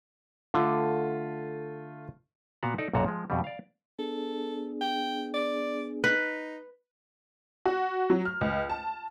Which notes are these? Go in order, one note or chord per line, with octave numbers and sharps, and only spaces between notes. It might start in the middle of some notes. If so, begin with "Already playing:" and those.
D3 A3 F4
A#2 B3 F#4 F5 F#5
D#4 A4 D5
B1 F#2 A#2 F#4 A5 A#5
F3 G#3
F2 B2 G3
D5 F5
B3 D4 G#4 A4
G5
D5
D#4 B4
F#4
F#3
F6
C#2
A5